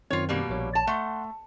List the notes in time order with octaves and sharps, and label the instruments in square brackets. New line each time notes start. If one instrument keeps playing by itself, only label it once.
[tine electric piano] F#2 D#3 C4 [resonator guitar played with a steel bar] F4 C#5
[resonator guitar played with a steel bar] B2 G3 A#3
[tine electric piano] A#1 C#5
[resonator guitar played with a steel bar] A5
[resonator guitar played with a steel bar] A3 [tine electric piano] F#5 C6